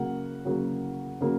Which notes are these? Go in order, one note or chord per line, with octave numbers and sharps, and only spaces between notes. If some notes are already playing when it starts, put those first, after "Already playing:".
Already playing: C#3 F#3 A#3 F#5
C#3 F#3 A#3
C#3 F#3 A#3